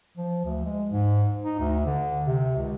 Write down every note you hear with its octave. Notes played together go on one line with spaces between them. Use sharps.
F3
D2
G#3
G#2
D#4
D2
D3
C3
C#2